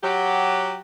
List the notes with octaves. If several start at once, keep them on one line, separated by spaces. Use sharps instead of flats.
F#3 G4